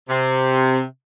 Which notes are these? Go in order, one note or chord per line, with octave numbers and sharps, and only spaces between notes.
C3